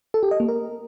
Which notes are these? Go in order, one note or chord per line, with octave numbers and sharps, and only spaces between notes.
A4
G4
D#5
A#3
A#4